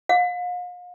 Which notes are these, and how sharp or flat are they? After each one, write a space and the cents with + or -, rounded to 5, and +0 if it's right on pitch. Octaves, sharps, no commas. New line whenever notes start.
F5 +40